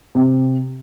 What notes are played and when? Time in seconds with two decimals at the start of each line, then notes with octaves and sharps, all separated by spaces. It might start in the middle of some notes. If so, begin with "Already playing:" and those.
0.15 C3